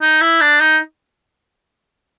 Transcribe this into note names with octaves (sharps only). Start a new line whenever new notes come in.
D#4
E4
D4
D#4